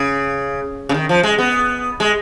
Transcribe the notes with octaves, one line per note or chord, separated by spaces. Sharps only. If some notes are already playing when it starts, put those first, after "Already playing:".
Already playing: C#3
C#3
D#3
F3
G#3
B3
G#3